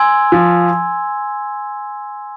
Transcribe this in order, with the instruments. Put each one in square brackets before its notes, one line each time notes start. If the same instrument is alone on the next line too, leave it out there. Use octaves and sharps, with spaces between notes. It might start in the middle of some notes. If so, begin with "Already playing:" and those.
Already playing: [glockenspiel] G#5 C6 E6 G#6
[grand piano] F3